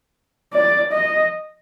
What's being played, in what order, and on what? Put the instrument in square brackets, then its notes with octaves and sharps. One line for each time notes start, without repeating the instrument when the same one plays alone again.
[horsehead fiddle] D5
D#5